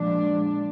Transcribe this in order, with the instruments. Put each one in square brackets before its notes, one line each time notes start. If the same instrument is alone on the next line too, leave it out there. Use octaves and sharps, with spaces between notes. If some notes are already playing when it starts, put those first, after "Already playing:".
Already playing: [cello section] A#2 F3 G#3 D4